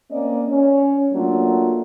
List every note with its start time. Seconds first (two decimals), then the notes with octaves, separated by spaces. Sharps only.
0.11 A#3 C4 C#4 D5 D#5
0.49 C#4
1.13 F#3 A3 A#3 D4 F4